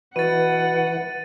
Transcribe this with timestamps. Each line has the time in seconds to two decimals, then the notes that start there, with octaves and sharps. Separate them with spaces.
0.16 B2 E3 F#5 A6 D#7